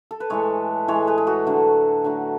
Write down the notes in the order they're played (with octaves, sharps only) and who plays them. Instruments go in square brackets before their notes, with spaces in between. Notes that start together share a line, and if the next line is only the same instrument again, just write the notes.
[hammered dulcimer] A4
B4
A2 E3 G#3 A4 C#5
A2 E3 G#3 A4 C#5
G#4 B4
G#4
F#4 A4
D3 F#3 A3
D3 F#3 A3